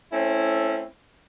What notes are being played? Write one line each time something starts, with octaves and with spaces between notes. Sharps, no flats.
A3 C4 C#4 E4